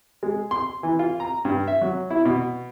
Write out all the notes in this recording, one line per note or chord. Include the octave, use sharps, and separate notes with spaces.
G#3
C6
E3
F4
A#5
G2
E5
F#3
E4
B2